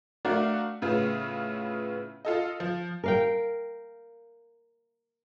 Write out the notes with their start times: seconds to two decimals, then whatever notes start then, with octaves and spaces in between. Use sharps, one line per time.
0.25 A3 D4 F#4 A#4 D5 F5
0.82 A2 C#3 B3 F4
2.25 F4 A4 D#5
2.60 F3
3.04 A#4 F5 G5